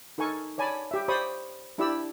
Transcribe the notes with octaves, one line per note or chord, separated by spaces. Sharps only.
D#4 A4 A#4 G#5 C#6
C#5 D5 G#5 A5 B5
G4 E5
G4 C5 D5 B5 C#6 D#6
D4 E4 G4 D5 B5 E6